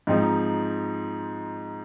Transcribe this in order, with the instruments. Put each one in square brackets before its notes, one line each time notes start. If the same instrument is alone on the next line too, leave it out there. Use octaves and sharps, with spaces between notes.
[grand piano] G#2 F3 C4 D#4